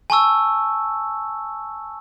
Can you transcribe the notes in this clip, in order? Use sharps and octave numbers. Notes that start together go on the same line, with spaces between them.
G#5 A5 C#6 E6